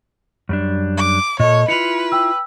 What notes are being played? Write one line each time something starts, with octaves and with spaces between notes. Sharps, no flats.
F#2 G3 D4
D6
A#2 A4 C#5 D#5
E4 F4 B4 C#7 F7
G5 E6